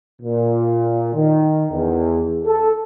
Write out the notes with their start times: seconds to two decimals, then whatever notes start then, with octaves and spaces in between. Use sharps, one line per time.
0.22 A#2
1.15 D#3
1.72 E2
2.45 A4